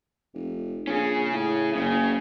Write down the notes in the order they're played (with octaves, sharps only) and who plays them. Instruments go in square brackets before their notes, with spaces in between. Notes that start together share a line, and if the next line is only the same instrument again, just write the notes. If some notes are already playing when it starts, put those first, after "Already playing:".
[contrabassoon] F1
[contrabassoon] A#1 [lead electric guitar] C#4 G#4
[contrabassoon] A2
[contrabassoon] F#1 [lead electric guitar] C#3